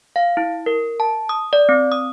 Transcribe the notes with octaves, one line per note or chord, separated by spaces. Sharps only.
F5
E4
A#4
A5
D#6
D5
C4
D#6